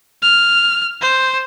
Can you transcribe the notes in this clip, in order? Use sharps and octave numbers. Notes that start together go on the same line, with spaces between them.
F6
C5